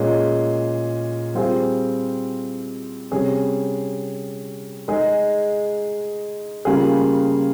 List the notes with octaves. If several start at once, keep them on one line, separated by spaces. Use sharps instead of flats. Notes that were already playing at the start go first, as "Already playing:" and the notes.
Already playing: A#2 G#3 C#4 G#4
G3 C4 F4 G#4
C3 G3 C#4 G#4
G#3 D#4 G#4
C#3 G3 A#3 F4 G#4